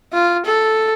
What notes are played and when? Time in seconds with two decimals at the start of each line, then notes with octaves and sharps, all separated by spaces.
0.13 F4
0.45 A4